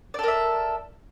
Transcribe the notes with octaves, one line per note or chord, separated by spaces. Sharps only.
A4 A#4 D5 E5